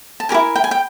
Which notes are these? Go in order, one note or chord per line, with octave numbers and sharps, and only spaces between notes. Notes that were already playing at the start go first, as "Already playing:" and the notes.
A5
G4 A#4 G#5
E4
G5
G#5
G5